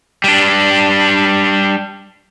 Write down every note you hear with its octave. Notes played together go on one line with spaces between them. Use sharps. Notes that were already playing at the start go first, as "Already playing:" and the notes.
G3 D4